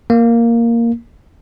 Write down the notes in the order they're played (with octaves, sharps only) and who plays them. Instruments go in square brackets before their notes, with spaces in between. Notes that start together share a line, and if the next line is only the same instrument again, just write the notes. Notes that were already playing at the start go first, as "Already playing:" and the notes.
[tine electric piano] A#3